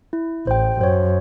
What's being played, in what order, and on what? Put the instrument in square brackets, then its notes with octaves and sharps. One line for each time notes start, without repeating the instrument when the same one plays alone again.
[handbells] E4
[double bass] A1 [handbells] C5 G5
[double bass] F#2 [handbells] C5 C#5